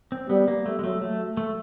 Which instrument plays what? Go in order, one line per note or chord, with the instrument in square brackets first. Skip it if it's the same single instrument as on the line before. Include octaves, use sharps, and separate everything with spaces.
[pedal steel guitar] C4
[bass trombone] G3 [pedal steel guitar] B3
[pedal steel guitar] A#3
A3
G#3
[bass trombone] F#3 [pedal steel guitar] A3
[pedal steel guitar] A3
A3